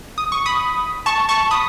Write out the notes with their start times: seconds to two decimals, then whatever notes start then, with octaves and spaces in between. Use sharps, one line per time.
0.18 D#6
0.32 C#6
0.46 B5 D#6
1.06 A5 C#6
1.29 A5 C#6
1.51 B5 D#6